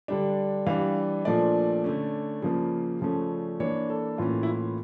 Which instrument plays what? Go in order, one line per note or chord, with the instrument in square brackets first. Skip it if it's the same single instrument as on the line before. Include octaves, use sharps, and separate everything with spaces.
[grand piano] D3 G3 D4
E3 G3 D4 F5
A#2 F3 A3 D4 D5
D3 A3 C#4
C#3 F3 A#3
C#3 F3 A3 C#4
E3 A#3 D4 C#5
A4
A2 E3 A#3 C#4 F4
E4
F4